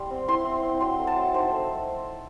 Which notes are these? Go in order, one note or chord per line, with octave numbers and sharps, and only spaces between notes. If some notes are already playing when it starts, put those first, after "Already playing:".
Already playing: G3 C6
C4
E4 C6
C4
C4
F#3 C6
A3
A5
F#3
D#4 C5
A3